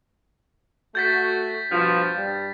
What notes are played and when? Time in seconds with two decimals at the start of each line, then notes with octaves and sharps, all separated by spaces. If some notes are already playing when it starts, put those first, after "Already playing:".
0.95 A3 F#4 G6 A6 B6
1.71 G2 B2 F3
2.17 G2 G3